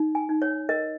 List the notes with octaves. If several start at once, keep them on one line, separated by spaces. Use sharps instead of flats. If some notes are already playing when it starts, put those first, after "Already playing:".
Already playing: D#4
G#5
D#4
C#5
A#4 D#5